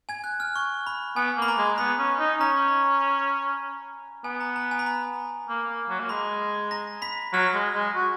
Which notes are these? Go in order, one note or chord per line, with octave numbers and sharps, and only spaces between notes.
G#5 G#6
F#6
F6
C#6
B5
B3 G#5
A#3
B5
A#5
G#3
B3 B5
C#4
D#4
C#4 A#5
B3 G#5
A#5
A#5
G#5
B5
A#5
A#3
A#3
F#3
A#3
G#3 B5
A#5 A#6
B5 B6
F#3 F6
G#3
G#3
F#4